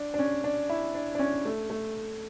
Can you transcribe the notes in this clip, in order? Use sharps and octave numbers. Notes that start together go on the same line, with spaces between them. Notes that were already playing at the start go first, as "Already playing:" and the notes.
Already playing: D4
D4
C#4
D4
E4
D4
D4
C#4
A3
A3